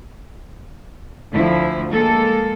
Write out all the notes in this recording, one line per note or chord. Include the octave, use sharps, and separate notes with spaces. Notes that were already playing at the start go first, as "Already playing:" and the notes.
D2 F3 E4
G#3 A#3 A4